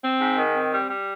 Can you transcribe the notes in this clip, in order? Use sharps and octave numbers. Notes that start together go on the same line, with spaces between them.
C4
G#2
D#3
C4
G3
G3